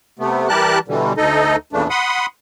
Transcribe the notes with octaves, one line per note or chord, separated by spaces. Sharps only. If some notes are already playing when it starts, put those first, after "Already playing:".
C3 A3 B3
E3 G3 G4 A#4 A5 F#6
B2 D3 E3 G3
D2 D#4 A4 D#5
E2 A#2 C#3 E3 A3 D4
F#5 B5 C6 D#6